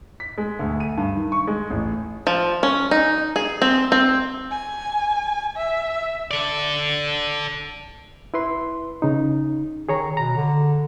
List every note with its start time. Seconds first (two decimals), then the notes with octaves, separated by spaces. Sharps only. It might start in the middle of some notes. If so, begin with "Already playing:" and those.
0.20 B6
0.38 G#3
0.59 D2
0.80 D#7
0.97 G2
1.16 D#3
1.32 C#6
1.47 G#3
1.70 A1
2.27 F3
2.63 C#4
2.91 D#4
3.36 G#4
3.62 C4
3.92 C4
4.51 G#5
5.56 E5
6.31 A4 D5
8.34 E4 B4 C6
9.02 C#3 D#4
9.89 D#3 G#4 C#5 A#5
10.17 B2 A#5
10.36 D3